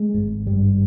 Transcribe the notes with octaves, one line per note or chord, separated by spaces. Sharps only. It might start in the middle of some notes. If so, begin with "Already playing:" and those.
Already playing: G#3
G#1 G#2
G2 G3